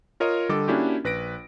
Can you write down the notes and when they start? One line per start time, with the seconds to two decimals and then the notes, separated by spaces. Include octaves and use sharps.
0.20 F4 A#4 C#5 D#5
0.49 D3 G3 A4 D#5 D6
0.68 A#3 C#4 D4 E4 F#4 G4
1.04 A#1 B4 A#6 D7